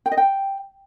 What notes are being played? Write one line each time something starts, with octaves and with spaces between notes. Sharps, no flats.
G5
D#5
G5